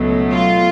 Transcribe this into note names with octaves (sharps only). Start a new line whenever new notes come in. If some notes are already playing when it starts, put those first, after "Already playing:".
Already playing: C#2 B2 F#3 A3
F4